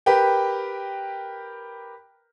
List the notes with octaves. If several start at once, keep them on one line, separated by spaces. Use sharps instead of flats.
G4 A#4 B4 G5